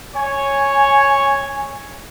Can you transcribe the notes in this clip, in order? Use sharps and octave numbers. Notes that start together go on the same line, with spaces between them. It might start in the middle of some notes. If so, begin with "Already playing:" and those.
C#5 G#5